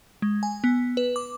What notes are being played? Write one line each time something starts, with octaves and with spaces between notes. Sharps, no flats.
G#3
G#5
B3
B4
D6